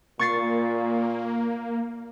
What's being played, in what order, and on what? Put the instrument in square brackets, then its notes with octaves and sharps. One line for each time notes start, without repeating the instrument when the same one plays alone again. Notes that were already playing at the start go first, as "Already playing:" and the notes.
[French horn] A#2 [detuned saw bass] A#3 [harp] C#6 A6 C7